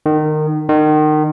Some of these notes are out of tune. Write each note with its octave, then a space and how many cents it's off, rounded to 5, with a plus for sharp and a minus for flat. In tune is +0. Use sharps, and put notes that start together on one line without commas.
D#3 -25
D#3 -30